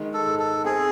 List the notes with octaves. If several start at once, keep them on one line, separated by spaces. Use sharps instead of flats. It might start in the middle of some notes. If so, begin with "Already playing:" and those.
Already playing: D#3 G#3
A4
G#2
A4
C4 G#4